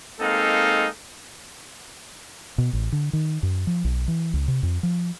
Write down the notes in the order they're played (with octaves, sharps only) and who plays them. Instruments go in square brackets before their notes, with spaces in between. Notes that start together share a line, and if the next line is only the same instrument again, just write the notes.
[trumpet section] G#3 A#3 C4 D#4 A4 F5
[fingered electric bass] B2
A1
D3
D#3
F#2
F3
B1
E3
C#2
C3
F2
F3